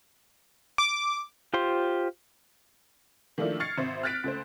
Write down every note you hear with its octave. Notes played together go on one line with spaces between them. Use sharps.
D6
F4 G4 C5 C6
D#3 F3 A3 A#3 D4 E4
C#6 F6 G#6 A6 C7 C#7
G#1 C5 E5
F6 F#6 A6 B6 D7
C#2 A3 C5